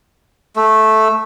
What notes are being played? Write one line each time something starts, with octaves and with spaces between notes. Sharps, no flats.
A3